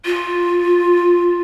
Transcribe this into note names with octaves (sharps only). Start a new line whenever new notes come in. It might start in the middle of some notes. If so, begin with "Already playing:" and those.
F4